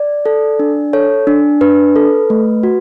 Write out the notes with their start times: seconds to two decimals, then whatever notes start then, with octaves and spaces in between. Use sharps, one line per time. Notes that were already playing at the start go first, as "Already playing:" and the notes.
Already playing: D5
0.26 A4
0.59 D4
0.93 A4 C#5
1.27 D4
1.61 D4 B4
1.96 A4
2.30 A3
2.63 F#4